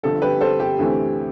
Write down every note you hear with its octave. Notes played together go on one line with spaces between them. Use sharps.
G1 G2 F3 A4
G4 B4
A4 C5
G4
D2 C3 E3 A3 C4